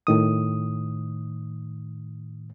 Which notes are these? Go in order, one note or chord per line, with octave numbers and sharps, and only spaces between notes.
A2 D#3 D#6